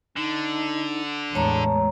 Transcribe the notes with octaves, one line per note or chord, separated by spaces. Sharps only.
D3 D#4
E2 A2 G#3 C#5 A5 A#5